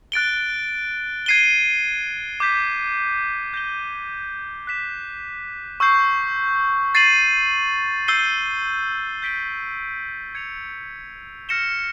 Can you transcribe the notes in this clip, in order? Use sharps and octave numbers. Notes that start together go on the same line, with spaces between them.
F#6 A6 D7 G7
G#6 C7 D#7 G7
D6 G6 B6
G6 A#6 D#7 G7
F#6 B6 E7
C#6 E6 G6 C7
A6 C7 D#7 F#7
E6 G6 C7 D#7 G7
G6 B6 D7 G7
G#6 C#7 F7
F6 A#6 C#7 E7 G7